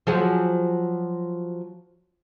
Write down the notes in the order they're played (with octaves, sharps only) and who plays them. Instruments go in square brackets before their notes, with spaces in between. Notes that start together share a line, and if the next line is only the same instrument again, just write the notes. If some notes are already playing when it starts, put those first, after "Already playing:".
[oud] F3 F#3 G#4